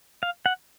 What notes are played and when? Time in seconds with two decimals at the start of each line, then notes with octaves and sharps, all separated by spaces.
0.23 F5
0.46 F#5